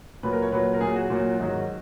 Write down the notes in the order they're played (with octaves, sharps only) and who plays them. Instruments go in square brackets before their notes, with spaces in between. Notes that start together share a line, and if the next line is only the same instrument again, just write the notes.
[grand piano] A#2 F#3 B4
A#4
C#5
A#2 F#3 B4
A#4
A#2 F#3 G#4
F#4
A#2 F#3
G#2 D#3 F#3